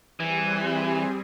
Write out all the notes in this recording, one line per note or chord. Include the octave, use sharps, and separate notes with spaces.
E3 G3 C4 G#4